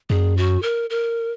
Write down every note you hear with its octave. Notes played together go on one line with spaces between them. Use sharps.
F#2 G#4
F#4
A#4
A#4